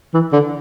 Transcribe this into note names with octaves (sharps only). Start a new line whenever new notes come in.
E3
D3